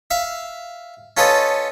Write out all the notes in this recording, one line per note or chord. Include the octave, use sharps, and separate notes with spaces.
E5 F5
C#4 F4 A4 B4 C#5 D#5